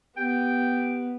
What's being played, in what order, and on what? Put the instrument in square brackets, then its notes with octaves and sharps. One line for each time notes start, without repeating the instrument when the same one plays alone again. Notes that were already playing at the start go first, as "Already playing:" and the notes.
[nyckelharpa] B3 [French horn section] G4 [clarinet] G5